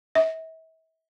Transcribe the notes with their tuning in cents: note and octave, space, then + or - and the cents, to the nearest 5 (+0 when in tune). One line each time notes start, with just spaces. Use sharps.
E5 -40